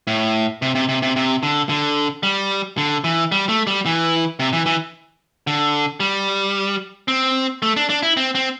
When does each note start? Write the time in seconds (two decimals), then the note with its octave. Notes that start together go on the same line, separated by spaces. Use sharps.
0.07 A2
0.62 C3
0.75 C3
0.89 C3
1.02 C3
1.16 C3
1.43 D3
1.69 D3
2.23 G3
2.78 D3
3.04 E3
3.32 G3
3.49 A3
3.67 G3
3.86 E3
4.39 C3
4.53 E3
4.66 E3
5.47 D3
6.00 G3
7.08 C4
7.62 A3
7.77 D4
7.89 D4
8.03 E4
8.17 C4
8.35 C4